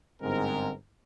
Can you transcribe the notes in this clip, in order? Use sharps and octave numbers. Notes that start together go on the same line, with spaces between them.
G1 G#2 C4 A#4